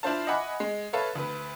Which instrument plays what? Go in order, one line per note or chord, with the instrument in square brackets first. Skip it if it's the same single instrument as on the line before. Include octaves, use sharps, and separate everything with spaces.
[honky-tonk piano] D4 E4 F4 C5 F5 A5
D#5 E5 F#5 G#5 B5 D6
G#3
A4 B4 C#5 E5 F5
D2 B4